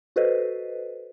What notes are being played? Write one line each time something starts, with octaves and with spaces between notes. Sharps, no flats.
F#4 A4 B4 C5 D#5